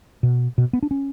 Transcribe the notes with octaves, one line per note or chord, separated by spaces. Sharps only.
B2
B2
B3
D4
C#4